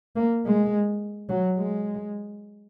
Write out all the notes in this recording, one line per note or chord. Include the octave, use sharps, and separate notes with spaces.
A#3
G#3
F#3
G#3